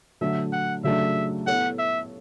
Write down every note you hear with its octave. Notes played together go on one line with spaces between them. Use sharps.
D3 F#3 A3 E5
F#5
C#3 F#3 A3 D4 E5
B3 E4 A4 C#5 F#5
E5